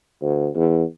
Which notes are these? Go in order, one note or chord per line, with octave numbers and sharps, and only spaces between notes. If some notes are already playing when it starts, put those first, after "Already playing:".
D2
E2